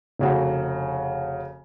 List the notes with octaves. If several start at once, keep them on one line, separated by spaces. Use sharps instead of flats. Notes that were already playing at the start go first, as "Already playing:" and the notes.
F1 C#3 F#4